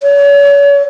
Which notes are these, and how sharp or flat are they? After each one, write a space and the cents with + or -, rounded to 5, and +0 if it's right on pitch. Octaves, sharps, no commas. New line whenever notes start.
C#5 +40